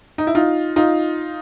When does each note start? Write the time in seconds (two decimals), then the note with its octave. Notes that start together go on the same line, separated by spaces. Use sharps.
0.18 D#4
0.27 E4
0.35 D#4 F4
0.76 D#4 F4